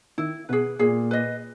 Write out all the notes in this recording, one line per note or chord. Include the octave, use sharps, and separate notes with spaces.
D#3 E4
B2 G#4 B4
A#2 G#4
B4 D#5